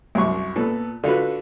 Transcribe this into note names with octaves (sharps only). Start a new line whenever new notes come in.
C2 F#2 C#6
A#2 B3 A4
D3 F4 F#4 B4